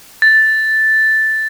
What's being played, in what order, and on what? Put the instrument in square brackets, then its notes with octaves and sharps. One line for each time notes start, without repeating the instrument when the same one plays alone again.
[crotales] A6